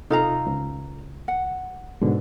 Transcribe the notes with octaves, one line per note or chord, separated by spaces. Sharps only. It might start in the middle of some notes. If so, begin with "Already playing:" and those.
C3 D#4 F4 A4 F5 A#5
C#2
F#5
G#2 B2 D3